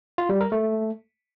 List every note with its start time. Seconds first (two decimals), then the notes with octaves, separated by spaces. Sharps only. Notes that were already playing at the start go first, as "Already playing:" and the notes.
0.18 F4
0.29 G3
0.41 A#4
0.52 A3